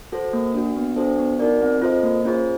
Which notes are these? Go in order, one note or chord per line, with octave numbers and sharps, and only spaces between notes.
F#4 A4 C5
A#3
D4 F#4
B3
D4 F#4 A4 C5
B3
D#4 F#4 A#4 D5
C4
F4 A4 C5 D#5
A#3
C#4 F4 G#4 C5